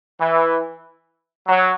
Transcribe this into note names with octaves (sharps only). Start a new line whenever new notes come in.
E3
F#3